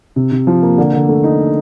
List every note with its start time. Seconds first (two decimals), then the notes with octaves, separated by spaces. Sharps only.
0.16 C3
0.32 C3
0.47 F3
0.63 A#3
0.78 D3
0.93 D3
1.09 A3
1.24 D#4